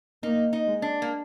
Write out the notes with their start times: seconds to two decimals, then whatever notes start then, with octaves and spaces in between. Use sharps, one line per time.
0.23 A#3 D#4
0.53 D#4
0.67 G#3
0.82 D4
1.02 A#3